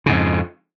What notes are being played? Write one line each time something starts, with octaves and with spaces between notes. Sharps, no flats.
F2 G#2 C#3